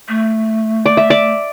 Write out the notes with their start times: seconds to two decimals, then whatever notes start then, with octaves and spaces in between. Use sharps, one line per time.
0.09 A3
0.86 D5
0.97 E5
1.10 D5